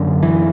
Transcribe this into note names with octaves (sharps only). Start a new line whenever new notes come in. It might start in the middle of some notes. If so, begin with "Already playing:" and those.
Already playing: F#2 D3
E3